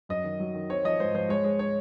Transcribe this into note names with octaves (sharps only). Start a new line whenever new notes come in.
F#2 D#5
D#3
F#3
D#3
C4 C#5
F3 D#5
G#2 C5
F3 C5
G#3 C#5
G#3
C#5